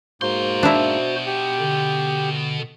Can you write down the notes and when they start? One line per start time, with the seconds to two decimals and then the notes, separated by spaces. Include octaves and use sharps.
0.22 G#2 B2 A#3 F#4 C5 C6
0.63 D4 E4
1.26 G4
1.60 D3